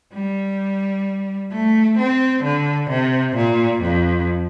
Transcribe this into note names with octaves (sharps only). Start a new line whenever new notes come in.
G3
A3
C4
D3
C3
A#2
F2